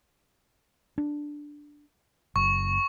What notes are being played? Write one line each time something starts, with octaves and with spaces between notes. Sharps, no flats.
D4
F#1 C#6